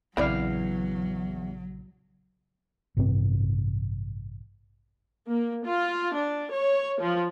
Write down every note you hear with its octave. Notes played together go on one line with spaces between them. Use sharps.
A#1 E2 C#3 F#3 C4 E4 D5 F5
A1 G2 C3 C4
A#3
F4
D4
C#5
F3